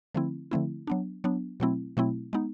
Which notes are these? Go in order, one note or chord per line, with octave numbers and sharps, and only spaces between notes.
D3 F3 A3 C4 E4
D3 F3 A3 C4 E4
F#3 B3 D4
F#3 B3 D4
B2 F#3 A3 C4 E4
B2 F#3 A3 C4 E4
G#3 B3 D#4